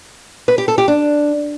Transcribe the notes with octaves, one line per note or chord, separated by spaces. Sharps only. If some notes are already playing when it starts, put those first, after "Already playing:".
B4
G4
A4
G4
D4